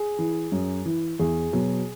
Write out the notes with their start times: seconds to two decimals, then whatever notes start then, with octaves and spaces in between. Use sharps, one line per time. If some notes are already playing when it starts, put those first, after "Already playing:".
Already playing: G#4
0.19 E3
0.52 F#2
0.85 E3
1.19 E2 G#4
1.53 B2 F#3